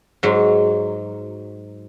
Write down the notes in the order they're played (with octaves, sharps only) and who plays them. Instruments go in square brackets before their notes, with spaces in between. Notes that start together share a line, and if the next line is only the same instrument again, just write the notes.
[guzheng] G#2 F#3